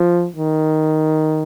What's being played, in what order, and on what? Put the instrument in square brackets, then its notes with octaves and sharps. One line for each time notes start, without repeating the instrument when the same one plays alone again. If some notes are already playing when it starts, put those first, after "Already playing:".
Already playing: [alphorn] F3
D#3